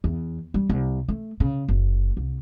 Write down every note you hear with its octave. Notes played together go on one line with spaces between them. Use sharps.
E2
G3
C2
A3
C#3
F#1
C2